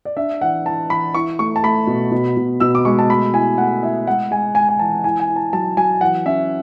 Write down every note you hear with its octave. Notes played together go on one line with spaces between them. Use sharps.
D5
D4 E5
E3 F#5
E3 A5
E3 B5
E4 C#6
A3 C#6
A5
A3 B5
B2
B2
B2
B2 E6
D6
G#3 C#6
A5
A3 B5
E4 G#5
A3 F#5
E4 E5
G#3 F#5
G#3 G#5
G#3 G#5
G#5
E3 A5
E4 G#5
G#5
E4
A5
F#3 A5
F#3 G#5
E3 F#5
C#4 E5